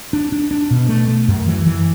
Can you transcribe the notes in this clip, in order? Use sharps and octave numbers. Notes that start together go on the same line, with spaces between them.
D4
D4
D4
B2
A3
A3
F#2
E3
E3